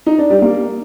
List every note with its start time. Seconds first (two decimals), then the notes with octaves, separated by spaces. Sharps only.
0.06 D#4
0.18 D4
0.30 G3
0.42 A#3